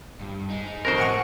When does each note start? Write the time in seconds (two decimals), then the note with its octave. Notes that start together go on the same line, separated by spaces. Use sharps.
0.21 G2
0.50 D#4 G#4
0.85 G#1 F2 A#4 C5 C#6
0.98 A2 F#5 G#5 C#6